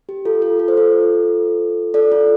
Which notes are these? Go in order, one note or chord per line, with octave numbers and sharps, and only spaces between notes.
G4
F4 A4
F4 A4
A4
C5
F4 A4
A4 D5
F4 A4